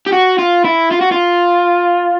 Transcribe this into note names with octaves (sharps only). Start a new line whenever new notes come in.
G4
F#4
F4
E4
F4
F#4
F4